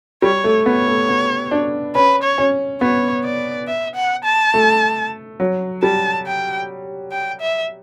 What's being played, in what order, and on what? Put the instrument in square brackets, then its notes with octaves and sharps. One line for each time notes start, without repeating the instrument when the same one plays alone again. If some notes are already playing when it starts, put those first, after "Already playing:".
[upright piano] G3 [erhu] C#5
[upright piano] A3
[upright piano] B3 [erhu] C#5
[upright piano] A3
B3
D4
[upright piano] C#4 [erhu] B4
[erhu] C#5
[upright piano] C#4
[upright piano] B3 [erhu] C#5
[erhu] D5
E5
F#5
A5
[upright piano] A3
F#3
[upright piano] G3 [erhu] A5
[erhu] G5
G5
E5